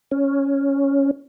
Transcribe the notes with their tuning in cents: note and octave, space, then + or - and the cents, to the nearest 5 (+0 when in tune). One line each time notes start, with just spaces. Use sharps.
C#4 +0